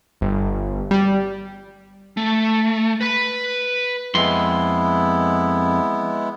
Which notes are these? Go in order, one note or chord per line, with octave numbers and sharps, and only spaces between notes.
G1
G3
A3
B4 B5
F2 G#3 B3 E4 C6